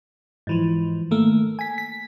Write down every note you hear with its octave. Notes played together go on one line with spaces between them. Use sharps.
G#2 E3 F3
D#3 A3 A#3
G#5 B6
B6